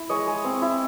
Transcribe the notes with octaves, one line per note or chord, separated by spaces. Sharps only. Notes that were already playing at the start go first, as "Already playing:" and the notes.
Already playing: E4
G#3 C#5 D#5
G#3
C4
E4